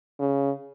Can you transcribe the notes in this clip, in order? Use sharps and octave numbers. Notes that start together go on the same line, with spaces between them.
C#3